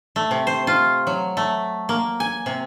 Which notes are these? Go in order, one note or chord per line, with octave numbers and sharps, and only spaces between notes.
A3
C3
C5
F4
F#3
A3
A#3
G#5
C3